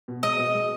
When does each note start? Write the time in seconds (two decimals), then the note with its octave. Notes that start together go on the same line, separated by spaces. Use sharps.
0.08 B2
0.23 G#3 D#5
0.39 B2
0.54 G#3